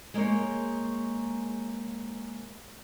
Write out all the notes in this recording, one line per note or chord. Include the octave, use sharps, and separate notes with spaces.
G#3 A#3 C5 C#5